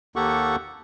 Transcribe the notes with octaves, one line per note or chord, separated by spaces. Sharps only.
D#2 A#3 G4 A4 F#5 C#6